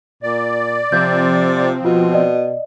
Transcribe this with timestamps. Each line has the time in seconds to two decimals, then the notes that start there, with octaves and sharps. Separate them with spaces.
0.23 A#2 D5
0.92 C3 F3 C4 G6
1.85 B2 F4
2.13 D5 D#5